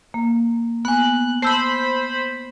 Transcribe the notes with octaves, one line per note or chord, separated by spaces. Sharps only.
A#3
B3 G#5 F#6
C5 A5 B5 E6